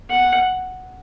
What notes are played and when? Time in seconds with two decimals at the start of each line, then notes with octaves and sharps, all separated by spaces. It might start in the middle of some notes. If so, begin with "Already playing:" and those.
0.10 F#5